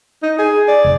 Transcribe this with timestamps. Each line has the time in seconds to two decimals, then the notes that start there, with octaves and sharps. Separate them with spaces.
0.23 D#4
0.38 G#4
0.68 D5
0.84 F1